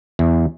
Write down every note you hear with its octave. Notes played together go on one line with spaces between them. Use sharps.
E2